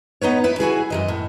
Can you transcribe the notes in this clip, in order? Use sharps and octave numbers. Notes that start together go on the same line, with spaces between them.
B3 D#4 B4 C#5
E4 B4
E4 F#4 G#4 G#5
F#2 D#3 D#5
A2